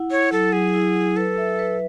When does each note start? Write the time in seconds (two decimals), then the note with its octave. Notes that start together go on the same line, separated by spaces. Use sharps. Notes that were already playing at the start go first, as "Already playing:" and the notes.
Already playing: E4 F#5
0.10 E4 C#5
0.32 F#3 A4
0.52 F#3 G#4
0.74 E4
0.95 F#3
1.16 A4 B4
1.38 E5
1.59 B4